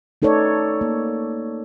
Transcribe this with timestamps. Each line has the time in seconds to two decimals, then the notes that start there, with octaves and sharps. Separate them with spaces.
0.22 A3 D#4 A4 B4 C#5 D5
0.81 A#3